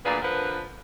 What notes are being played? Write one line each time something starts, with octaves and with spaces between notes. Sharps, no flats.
D2 A#2 A#3 G#4 B4 D5
D3 F3 A#4 B4